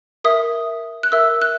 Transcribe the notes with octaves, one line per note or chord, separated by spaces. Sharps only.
A#4 E5 D#6
F#6
A#4 E5 E6
F#6